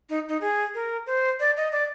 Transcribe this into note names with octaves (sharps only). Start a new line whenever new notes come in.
D#4
D#4
G#4
A#4
C5
D5
D#5
D5